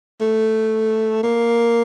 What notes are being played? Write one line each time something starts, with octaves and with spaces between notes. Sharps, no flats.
A3
A#3